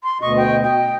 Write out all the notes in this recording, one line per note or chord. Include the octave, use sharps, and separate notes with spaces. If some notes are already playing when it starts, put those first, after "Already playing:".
C6
D2 B2 D#5 C#6
G5
D#5 G5